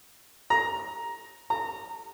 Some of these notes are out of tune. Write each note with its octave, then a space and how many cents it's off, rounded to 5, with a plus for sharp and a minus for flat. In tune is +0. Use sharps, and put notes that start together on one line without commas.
A#5 +10
A#5 -20